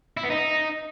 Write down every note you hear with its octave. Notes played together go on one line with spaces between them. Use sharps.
E4
B3
D#4